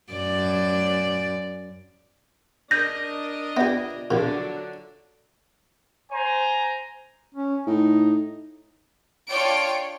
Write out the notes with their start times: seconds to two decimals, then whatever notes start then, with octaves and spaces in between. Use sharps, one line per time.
0.13 F#2 D5
2.71 D4 A#4 D#5 G6 A#6
3.57 B3 F4 G4 D5 E5
4.11 A#1 A#2 D3 F#3 D4
6.12 C5 G#5 A#5
7.35 C#4
7.67 A2 D#4
9.30 D4 F4 C#5 D5 G5 D7